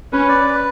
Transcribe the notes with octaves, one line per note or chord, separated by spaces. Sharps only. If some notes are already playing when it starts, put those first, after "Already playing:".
C#4 B4
D5
B4